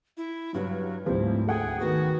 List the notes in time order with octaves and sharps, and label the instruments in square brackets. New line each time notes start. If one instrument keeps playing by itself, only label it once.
[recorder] E4
[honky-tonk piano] G2 [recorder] F#3
[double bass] D2 G#2 [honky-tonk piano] F3 G3 C4 [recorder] E4
[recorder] G#4 [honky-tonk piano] A4 F#5 G5
[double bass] D#3 B3 [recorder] F#4